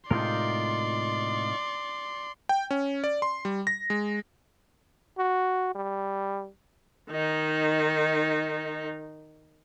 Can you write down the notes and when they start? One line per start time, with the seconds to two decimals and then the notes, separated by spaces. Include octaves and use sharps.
0.11 A2 C3 G#3 D#4 F4 A#4 D5 C6
2.49 G5
2.71 C#4
3.04 D5
3.22 C6
3.45 G3
3.67 A#6
3.90 G#3
5.18 F#4
5.75 G3
7.11 D#3 D#4